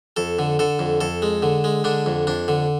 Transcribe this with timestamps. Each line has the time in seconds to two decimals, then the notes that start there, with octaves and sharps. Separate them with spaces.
0.16 F2 A4
0.39 D3
0.59 D3 A4
0.79 F2
1.01 F2 A4
1.22 G#3
1.42 D3
1.64 G#3
1.84 D3 D4
2.06 F2
2.27 F2 D4
2.48 D3